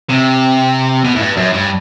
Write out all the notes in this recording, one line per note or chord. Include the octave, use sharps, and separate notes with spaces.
C3
B2
A2
G2
F#2
G2